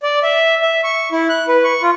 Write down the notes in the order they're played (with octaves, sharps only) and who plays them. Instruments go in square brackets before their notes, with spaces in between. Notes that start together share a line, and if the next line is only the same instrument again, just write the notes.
[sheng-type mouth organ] D5
E5
E5
C#6
E4
F#6
B4
C#6
F4